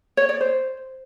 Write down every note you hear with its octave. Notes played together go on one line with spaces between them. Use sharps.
C#5
D5
C5